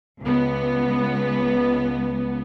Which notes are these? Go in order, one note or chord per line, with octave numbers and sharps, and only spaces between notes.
C#2 B3